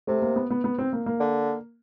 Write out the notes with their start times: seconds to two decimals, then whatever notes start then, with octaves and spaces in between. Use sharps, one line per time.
0.07 C3 A3
0.22 A#3
0.36 B3
0.50 B3
0.64 B3
0.78 C4
0.93 A#3
1.06 A#3
1.20 D3